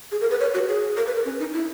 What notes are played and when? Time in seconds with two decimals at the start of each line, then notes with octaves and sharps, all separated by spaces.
0.12 G#4
0.21 A#4
0.31 B4
0.40 C#5
0.54 F#4
0.68 G#4
0.97 A#4
1.06 B4
1.15 A#4
1.25 C#4
1.39 D#4
1.53 E4